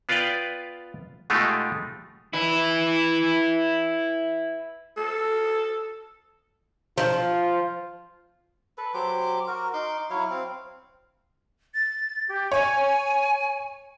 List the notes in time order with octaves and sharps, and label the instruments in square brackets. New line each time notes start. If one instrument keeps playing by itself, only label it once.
[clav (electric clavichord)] B3 F4 B4 D5 F5 G5
B2 G#3 A3 D#4 F4 G4
[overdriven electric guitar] E4 B4
[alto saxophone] A4
[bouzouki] F3 [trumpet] F4
[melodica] A4 B4
F#3 G4 C5 D6
F#4 A#4
D#4 C6 D6
F#3 E4 C#5 F5
C4 F5
[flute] A6
G4
[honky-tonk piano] C#5 [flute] G#5